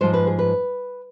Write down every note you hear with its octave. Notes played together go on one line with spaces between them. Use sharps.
G#2 F3 G#3 C5
B4
G#4
B4